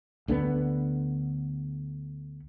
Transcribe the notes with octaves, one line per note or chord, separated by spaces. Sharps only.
D2 D3 E3 B3